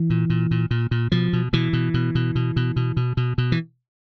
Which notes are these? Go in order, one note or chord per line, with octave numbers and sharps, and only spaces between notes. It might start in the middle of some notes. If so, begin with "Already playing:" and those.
Already playing: E3
A#2
A#2
A#2
A#2
A#2
B2 F3
B2
B2 E3
B2
B2
B2
B2
B2
B2
B2
B2
B2
E3